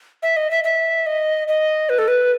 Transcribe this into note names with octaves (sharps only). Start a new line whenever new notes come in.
E5
D#5
E5
E5
D#5
D#5
B4
A4
B4